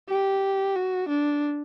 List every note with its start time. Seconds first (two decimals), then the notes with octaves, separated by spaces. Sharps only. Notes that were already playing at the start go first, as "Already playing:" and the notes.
0.09 G4
0.76 F#4
1.09 D4